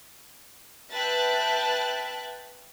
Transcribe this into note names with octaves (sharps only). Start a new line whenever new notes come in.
B4 E5 G5 A5 F#6 A6